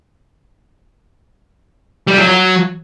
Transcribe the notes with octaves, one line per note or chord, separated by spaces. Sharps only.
G3
F#3
F#3